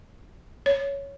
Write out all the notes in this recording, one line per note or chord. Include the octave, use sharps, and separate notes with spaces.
C#5